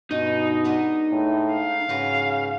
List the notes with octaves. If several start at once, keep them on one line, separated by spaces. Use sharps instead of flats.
G2 B2 C#4 D#4
G#3 B3 D4
A2
F5
G#2 C#3 F#4 B4